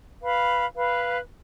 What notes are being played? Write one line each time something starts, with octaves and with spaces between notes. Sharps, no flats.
B4 F5 B5
B4 F5 B5